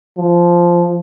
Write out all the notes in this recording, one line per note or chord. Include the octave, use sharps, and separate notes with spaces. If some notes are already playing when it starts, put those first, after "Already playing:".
F3